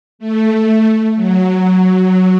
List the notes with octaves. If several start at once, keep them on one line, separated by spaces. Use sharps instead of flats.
A3
F#3